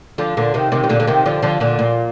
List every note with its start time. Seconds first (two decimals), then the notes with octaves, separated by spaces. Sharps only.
0.18 D3 F3
0.37 A#2 D3
0.54 C3 D#3
0.72 C3 D#3
0.84 C3
0.89 A#2 D3
1.00 D3
1.07 C3 D#3
1.26 D3 F3
1.42 D3 F3
1.60 A#2 D3
1.79 A#2